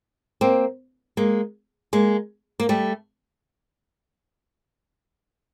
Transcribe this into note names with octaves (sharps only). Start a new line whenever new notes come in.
A#3 C4
G#3 A#3
G#3 A#3
A#3
G3 A3